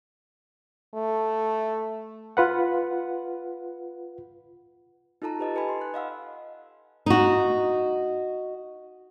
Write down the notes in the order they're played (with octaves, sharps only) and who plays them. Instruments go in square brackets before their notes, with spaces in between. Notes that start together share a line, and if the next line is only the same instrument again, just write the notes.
[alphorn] A3
[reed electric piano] F4 B4 F#5
[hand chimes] D#4 F4 A4 A5 A#5
G4 B4 D#5 A5
A4 B4 G#5 B5
C6
F#6
D#5 F5 F#5 E6
[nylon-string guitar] D#4 F#4